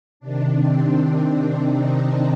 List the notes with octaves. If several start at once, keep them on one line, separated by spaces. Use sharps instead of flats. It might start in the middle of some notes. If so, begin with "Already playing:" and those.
C3 D#3 D4
C4
D4
D#4